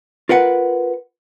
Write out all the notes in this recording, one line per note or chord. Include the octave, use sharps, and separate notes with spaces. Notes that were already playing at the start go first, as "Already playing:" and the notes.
F4 A#4 B4 F#5